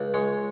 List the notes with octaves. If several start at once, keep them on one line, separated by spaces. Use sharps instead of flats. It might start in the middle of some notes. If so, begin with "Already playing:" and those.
Already playing: C#2
G#3 C#5